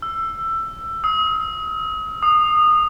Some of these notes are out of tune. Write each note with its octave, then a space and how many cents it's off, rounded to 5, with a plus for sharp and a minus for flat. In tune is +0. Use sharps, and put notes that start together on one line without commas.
E6 +15
D#6 +40
D#6 -20